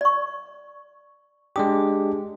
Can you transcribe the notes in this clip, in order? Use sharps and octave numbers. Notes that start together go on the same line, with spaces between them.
D5 C#6
G#3 D4 G4 D#6